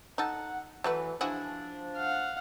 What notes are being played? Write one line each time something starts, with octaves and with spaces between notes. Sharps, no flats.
D#4 A4 F#5
E3 F#3 A3 B4
F3 D4 E4 F#4 G#4
F5 F#5